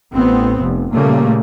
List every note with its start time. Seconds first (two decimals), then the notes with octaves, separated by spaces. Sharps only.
0.12 A1 B3 C4
0.62 F1
0.92 A#2 C#3 G3 A3 A#3